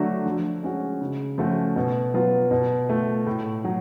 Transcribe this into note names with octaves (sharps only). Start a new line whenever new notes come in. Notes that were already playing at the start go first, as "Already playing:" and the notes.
Already playing: D3 F#3 A3 D4 F#4
F3
G#3 C#4 F#4
C#3
F3 A3 C#4 F#4
B2
F#3 B3 F4
B2
A3 F4
A2
F#3